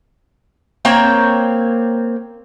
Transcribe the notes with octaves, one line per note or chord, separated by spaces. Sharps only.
A#3 C4 C#5 G5